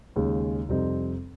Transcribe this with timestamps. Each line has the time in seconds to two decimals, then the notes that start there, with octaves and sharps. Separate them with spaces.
0.16 D#2 C#3 G#3
0.69 F2 C3 G3 C4 D#4